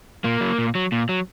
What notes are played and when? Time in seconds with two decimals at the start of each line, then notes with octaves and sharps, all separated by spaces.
0.24 A#2 A#3
0.41 F#3
0.59 A#2
0.75 F#3
0.92 A#2
1.09 F#3